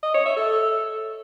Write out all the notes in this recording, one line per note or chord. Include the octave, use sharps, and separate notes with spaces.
D#5
C#5
E5
A4